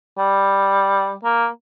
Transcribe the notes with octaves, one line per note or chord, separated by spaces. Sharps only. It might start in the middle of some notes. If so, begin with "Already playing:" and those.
G3
A#3